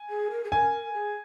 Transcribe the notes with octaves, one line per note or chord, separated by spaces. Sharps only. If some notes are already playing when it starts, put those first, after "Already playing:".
Already playing: G#5
G#4
A#4
G#4
A#4 G#5
G#4